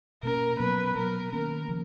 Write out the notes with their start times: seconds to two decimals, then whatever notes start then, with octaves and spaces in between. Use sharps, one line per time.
0.23 B2 A#3 C#4 A#4
0.59 B2 F#3 B3 B4
0.96 B2 F#3 B3 A#4
1.32 D#3 A#3 C#4 A#4
1.68 C#3 F3 A#3